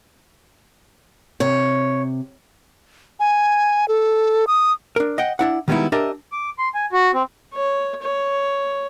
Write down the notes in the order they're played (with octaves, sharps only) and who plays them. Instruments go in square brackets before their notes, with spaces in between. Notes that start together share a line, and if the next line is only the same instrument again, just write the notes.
[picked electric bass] C3 [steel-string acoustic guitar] C#5
[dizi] G#5
A4
D#6
[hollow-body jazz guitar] D4 A#4
D#5 F#5 G5
D4 E4 F#5
D#3 G3 G#3 B3 D#4 E4
D4 G4 A#4 D#5 E5
[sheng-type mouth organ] D6
C6
G#5
F#4
C4
[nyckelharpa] C#5
C#5